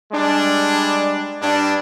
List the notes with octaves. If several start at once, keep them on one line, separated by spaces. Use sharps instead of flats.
G3 G#3 D4
G2 D4